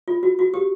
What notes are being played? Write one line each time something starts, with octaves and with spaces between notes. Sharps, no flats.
F4
F#4
F#4
G4